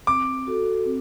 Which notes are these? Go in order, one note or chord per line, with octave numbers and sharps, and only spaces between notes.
C4 D6
F#4 A4
C4